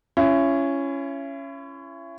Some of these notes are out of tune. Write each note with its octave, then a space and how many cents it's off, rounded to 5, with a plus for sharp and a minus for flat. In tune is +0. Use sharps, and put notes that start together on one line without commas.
C#4 +0 E4 +40